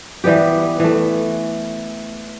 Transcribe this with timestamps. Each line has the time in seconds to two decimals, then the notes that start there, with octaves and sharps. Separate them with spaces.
0.24 E3 G3 B3 G4
0.80 E3 A3